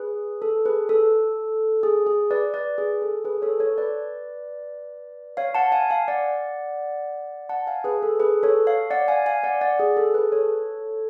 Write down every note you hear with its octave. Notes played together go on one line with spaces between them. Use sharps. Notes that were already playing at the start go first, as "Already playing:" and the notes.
Already playing: G#4 B4
A4
G#4 B4
A4
G#4
G#4
B4 D5
B4 D5
G#4
A4
G#4 B4
A4 C#5
A4 C#5
B4 D5
C#5 F5
F#5 A5
F5 G#5
F5 G#5
D5 F#5
F#5 A5
F5 G#5
G#4 B4
A4
G#4 B4
A4 C#5
C#5 F5
D5 F#5
F5 G#5
F5 G#5
D5 F#5
D5 F#5
G#4
A4
G#4 B4
A4 C#5